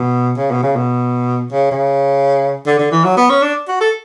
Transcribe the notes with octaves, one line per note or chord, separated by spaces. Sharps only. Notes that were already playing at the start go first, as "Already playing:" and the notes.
Already playing: B2
C#3
B2
C#3
B2
C#3
C#3
D3
D3
E3
F#3
B3
C#4
D4
F#4
A4